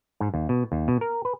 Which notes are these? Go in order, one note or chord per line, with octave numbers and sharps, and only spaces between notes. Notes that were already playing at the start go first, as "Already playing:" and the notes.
G#2
D#2
B2
D#2
B2
A#4
B4